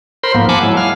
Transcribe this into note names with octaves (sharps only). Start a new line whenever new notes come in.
A#4 C5 B5 C6
G#2 F3 A#3 B3
F#5 G#5 A5 B5 D6
F#3 G#3 E4
F5 F6